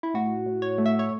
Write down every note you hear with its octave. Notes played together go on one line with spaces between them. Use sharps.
E4
A2 F#4
A2
C#5
A3
E5
C#5